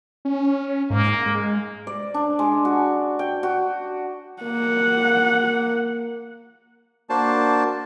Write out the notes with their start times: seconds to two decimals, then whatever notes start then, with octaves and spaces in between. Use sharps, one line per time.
0.25 C#4
0.90 G#2 A#3
1.26 G#3
1.87 D5
2.14 D4
2.39 G#3
2.65 F#4
3.19 G5
3.43 F#4
4.42 A#3 F#5
7.10 A#3 D4 F#4 C5 D5 A5